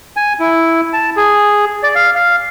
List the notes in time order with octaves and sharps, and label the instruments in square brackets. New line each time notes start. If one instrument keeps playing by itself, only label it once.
[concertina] G#5
E4
A5
G#4
D5
F5
F5